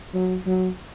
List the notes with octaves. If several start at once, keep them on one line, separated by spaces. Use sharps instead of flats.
F#3
F#3